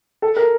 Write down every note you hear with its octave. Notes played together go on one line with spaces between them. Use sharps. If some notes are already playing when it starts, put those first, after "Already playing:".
A4
A#4